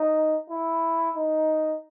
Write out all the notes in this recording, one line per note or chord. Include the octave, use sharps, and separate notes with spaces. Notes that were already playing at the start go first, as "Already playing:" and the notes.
Already playing: D#4
E4
D#4